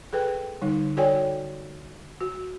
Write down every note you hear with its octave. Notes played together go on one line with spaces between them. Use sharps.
G#4 A4 B4 G5
D3 G3 D#4
F#4 A4 C#5 D5 G5 G#5
F#4